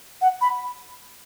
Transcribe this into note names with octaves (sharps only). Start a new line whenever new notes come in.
F#5
B5